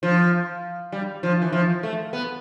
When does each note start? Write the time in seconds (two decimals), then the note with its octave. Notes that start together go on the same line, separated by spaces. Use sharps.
0.03 F3
0.92 G3
1.23 F3
1.42 E3
1.53 F3
1.83 A3
2.13 B3